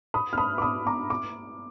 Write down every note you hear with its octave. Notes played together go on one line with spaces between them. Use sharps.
B5 D#6
F6
B5 D#6
D6
B5 D#6
A#5 D6
D6